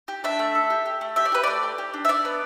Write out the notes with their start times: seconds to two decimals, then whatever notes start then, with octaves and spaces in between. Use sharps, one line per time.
0.08 G4
0.24 D4 E5
0.39 A3
0.55 A4
0.70 G4
0.86 G4
1.01 A3
1.16 G4 E5
1.25 D5
1.32 G4 B4
1.44 A3 D5
1.63 G4
1.78 G4
1.94 D4
2.05 E5
2.09 D4 D5
2.25 B3